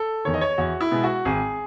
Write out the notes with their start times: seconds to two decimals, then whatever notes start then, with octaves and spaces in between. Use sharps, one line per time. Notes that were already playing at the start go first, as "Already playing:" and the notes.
Already playing: A4
0.25 E2 D#3 C#5
0.34 D#5
0.41 C#5
0.58 E2 F#4
0.80 E4
0.91 B2 G#3 B3
1.03 F#4
1.25 G#1 G#4